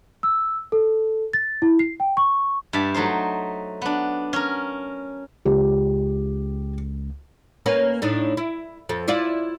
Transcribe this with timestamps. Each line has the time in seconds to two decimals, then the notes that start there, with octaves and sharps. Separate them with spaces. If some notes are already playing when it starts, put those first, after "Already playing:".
0.23 E6
0.72 A4
1.33 A6
1.62 E4
1.79 C7
2.00 G5
2.17 C#6
2.73 G2 G4 E5 A5
2.94 F#3 A3 D#4 C5
3.82 B3 D4
4.33 C#4 A#4
5.45 C#2 G4
7.66 A#3 C#4 B4
8.02 A2 D4 D#4
8.37 E4
8.89 F2 A4
9.08 E4 F4 D5